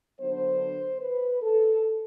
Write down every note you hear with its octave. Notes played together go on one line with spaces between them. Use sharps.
D3 F#3 B3 D4 C5
B4
A4